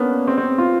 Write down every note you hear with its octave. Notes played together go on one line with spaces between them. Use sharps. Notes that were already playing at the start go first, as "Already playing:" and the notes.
Already playing: A#3 B3 C#4 D4
C4
C4
F4